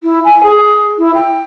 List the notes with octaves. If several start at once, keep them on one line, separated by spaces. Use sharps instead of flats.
E4
G#5
G#4
E4
G5